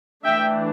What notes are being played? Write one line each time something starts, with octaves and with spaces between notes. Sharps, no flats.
E3 A3 D4 E5 G5